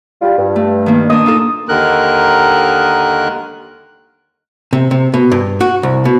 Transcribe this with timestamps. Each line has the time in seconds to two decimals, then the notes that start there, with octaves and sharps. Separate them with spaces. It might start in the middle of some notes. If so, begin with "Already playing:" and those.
0.22 G3 F4
0.39 G2
0.56 A3
0.86 D#3 A#3
1.10 A#2 D4 D#6
1.26 D#4 F4 A4
1.69 D#2 D3 D#3 A#4 F#6
4.73 C3
4.91 C3
5.14 B2
5.32 G2
5.61 F#4
5.83 C2
6.05 B2